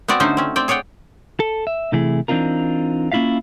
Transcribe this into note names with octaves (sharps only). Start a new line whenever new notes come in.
B3 C4 F#4 D5
D3 A3 C#4 D#4 C5
C4 C#4
C4 D5 G5
G#4 C#5 D5 F#5 G5
A4
E5
C3 E3 A3 E4 G#4
E3 C4 D4 D#4 F4 A#4
A#3 C#4 E4 F4 E5 F5